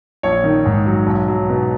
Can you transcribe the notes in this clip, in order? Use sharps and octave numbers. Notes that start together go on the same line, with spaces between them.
A#1 C#5
D#3
G#2
F#3
B1
F#3
B2